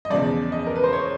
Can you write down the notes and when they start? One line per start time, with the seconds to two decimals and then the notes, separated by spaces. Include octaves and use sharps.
0.05 D#5
0.10 E2 C#3 F3 D5
0.52 D#5
0.66 A#4
0.75 B4
0.83 C5
0.93 C#5